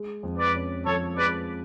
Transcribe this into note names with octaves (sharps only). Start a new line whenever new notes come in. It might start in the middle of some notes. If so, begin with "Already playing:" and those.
Already playing: G#3
F2
B4 D5
C#4
F3 A4 C#5
G#3 B4 D5